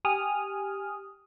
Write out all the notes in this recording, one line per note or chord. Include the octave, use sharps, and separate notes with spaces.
G4 G#5 D#6 F6